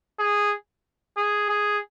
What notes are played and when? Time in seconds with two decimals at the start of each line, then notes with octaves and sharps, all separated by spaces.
0.19 G#4
1.17 G#4
1.49 G#4